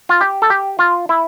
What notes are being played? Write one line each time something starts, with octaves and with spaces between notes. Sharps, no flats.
F4
G4
A4
G4
F4
E4